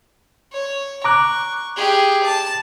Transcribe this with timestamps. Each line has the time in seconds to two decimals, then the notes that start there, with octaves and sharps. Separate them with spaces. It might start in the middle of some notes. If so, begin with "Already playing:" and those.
0.53 C#5
1.04 A#5 C#6 D6 F#6
1.77 G4 G#4
2.24 A5